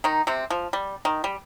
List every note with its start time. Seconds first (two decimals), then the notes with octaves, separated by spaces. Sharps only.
0.04 D#3 D#4
0.27 C3 C4
0.50 F3
0.73 G3
1.05 D#3
1.24 G3